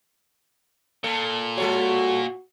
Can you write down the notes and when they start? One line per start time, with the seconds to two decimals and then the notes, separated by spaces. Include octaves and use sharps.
1.04 A#2 A4
1.58 G3 F#4 A4 C#5